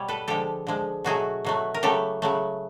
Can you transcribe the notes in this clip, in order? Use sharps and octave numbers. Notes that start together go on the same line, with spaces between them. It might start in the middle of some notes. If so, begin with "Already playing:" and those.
Already playing: B2 G3 C#5
A4 B4
D3 F3 G#3 G4 A4
D3 F3 G#3
B2 F#3 A3 F#4 G#4
B2 F#3 A3
A#4
C#3 F#3 A3 G4 A4
C#3 F#3 A3